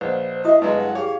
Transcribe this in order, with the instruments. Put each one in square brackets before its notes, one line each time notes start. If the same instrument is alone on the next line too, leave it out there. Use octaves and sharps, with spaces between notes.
[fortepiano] A#1 [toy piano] B4 D#5 F#5 [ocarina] C5
[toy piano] E4 F#4 D#6 [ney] D#5 [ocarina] E5
[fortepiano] G2 F#3 G#3 [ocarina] B4 [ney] D#5
[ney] F#5
[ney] G4 [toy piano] G#4 G5 [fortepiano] C#5 [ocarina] F5